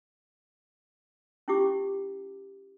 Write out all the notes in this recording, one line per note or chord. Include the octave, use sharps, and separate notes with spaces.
C#4 E4 F4 G4 D6